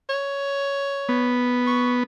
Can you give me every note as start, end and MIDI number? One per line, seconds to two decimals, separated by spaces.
0.10 1.39 73
1.09 2.03 59
1.67 1.94 85